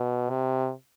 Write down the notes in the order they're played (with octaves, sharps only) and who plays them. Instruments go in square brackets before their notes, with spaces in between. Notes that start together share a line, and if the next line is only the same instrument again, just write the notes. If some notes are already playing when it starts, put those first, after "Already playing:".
Already playing: [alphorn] B2
C3